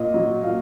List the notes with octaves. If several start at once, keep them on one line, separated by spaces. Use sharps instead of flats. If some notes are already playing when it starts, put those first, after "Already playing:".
Already playing: A#2 D#5
F#3
A#2 F5